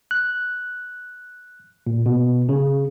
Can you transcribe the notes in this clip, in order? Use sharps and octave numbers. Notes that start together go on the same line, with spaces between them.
F#6
A#2
B2
C#3